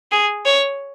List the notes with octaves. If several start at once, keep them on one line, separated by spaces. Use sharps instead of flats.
G#4
C#5